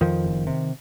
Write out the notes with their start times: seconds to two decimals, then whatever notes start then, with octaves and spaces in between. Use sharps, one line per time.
0.01 F2 D#3 F3
0.24 F#1
0.47 C3